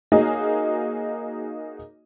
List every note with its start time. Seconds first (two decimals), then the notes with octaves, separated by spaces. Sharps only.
0.12 A#3 D#4 F#4 G#4 C#5 D#5